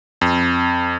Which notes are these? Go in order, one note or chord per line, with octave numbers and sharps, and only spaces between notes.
F2